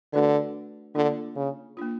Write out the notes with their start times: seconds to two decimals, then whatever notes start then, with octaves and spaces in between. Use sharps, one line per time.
0.13 D3 A3 D4 F#4 B4 D5
0.95 D3 A#3 D4 F4
1.36 C#3
1.77 A#3 D4 F4